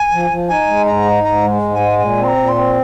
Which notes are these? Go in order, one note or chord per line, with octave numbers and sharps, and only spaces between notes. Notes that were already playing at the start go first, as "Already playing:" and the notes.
Already playing: G#5
F3
F3
D#4 G#5
G#3
G#2 A#5
D#4
G#2 A#5
G#3
G#2
G#5
G#3
A#2 G#5
C4
C6
A#5
A#2
C6
C4